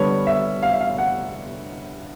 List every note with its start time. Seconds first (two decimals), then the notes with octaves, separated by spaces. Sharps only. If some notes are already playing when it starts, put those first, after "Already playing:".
Already playing: D3 G3 B3 D4 C#5
0.27 E5
0.62 F5
0.72 E5
0.81 F5
0.98 F#5